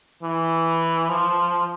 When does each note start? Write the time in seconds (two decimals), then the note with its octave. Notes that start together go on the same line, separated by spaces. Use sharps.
0.23 E3
1.09 F3